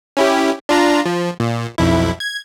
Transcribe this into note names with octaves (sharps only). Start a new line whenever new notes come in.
C#4 E4 G4
D4 F4 A#5
F3
A#2
B1 F2 E4
G#6